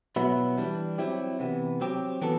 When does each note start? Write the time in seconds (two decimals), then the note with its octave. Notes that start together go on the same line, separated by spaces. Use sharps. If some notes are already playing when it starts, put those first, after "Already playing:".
0.16 B2 F#3 B3 E4
0.57 E3 G3 D4
0.98 F#3 C4 E4 G4
1.40 C3 E3 B3
1.81 F#3 C4 G4
2.21 E3 B3 F#4 A4